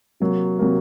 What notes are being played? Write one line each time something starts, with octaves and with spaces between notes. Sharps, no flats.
C3 F#3 A#3
C3 F#3 A#3